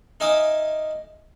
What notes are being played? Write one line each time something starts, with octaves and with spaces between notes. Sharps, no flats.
D#4 E5 F5 G#5 D6 D#6